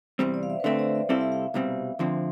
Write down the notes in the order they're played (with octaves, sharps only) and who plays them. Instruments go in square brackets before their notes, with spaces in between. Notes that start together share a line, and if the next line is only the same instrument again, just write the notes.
[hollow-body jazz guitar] E2 C3 G3 C4 [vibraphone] C5
[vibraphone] D5
F5
E5
B4
[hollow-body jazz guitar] D3 A3 C4 [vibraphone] C5
[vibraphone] D5
E5
[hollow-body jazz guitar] C3 G3 C4 E4 A4 [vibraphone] F5
[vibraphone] E5
F5
F5
[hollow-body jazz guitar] C2 B2 G3 C4
D2 D3 F3 C4